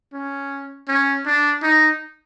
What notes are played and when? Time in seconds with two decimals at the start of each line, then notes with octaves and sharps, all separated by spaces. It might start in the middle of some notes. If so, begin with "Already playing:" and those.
0.13 C#4
0.88 C#4
1.26 D4
1.63 D#4